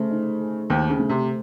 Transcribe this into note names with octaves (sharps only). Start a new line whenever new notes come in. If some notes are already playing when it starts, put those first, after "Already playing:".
Already playing: C#3 A3 C5
D#4
G#4
D#2 D#3 C5
C#3
A3
C3